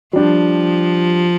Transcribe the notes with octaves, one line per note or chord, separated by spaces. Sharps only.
F3 G3 D4 G4